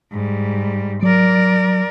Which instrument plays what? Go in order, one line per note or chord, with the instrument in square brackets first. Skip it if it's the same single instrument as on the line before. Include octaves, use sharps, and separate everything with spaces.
[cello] G#2 G3
[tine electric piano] F#3 [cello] A#4 D5